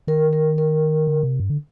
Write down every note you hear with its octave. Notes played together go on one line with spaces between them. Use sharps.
D#3 A#4
A#4
A#4
D3
C3
G2
D3